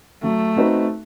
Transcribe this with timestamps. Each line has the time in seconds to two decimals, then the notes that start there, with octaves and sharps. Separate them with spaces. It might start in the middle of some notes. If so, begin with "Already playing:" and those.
0.23 F#3 A3
0.56 C4 D#4 F#4 B4